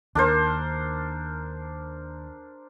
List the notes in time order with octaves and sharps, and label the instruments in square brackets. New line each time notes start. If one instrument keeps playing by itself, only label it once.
[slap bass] D#2 [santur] D4 A#4 C5